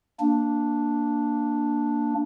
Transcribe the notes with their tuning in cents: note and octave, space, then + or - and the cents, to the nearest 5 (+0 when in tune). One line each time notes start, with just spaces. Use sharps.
A#3 +0 D4 +0